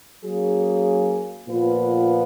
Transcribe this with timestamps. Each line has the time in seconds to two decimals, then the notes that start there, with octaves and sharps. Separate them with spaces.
0.24 F#3 A#3 C#4 G#4
1.48 A#2 F3 B3 F4 B4